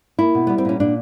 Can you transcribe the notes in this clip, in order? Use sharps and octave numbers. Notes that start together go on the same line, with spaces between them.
A#3 E4
B2
G3 B3
C4
A#2 C#4
A#2 D4